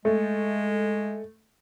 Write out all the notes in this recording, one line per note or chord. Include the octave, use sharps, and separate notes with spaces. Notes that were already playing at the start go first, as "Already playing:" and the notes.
G#3 A3